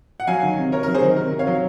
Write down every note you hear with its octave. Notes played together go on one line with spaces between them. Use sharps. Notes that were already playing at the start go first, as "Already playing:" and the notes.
F#5
F#3 F5 G#5
D#3
C3
C3 A#4 C#5
A#4
F#3
G#4 C5
D#3 A#4
C3 A#4
C3
C#5 F5
F#3